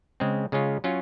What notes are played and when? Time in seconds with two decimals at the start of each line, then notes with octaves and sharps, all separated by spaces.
0.20 C#3 G#3 C4
0.52 C#3 G#3 C#4 F4
0.84 F#3 C#4 F4